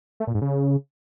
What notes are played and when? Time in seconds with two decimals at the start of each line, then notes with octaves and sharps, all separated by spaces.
0.20 A3
0.27 A#2
0.34 G#2
0.42 C#3